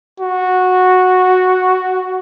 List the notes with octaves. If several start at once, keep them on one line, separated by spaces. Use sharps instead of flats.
F#4